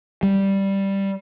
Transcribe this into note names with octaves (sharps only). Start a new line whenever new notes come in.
G3